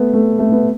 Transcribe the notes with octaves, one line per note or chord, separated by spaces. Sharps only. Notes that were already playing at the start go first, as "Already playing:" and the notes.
Already playing: A3 B3
A3
A3
B3